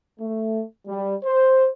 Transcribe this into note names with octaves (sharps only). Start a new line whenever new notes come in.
A3
G3
C5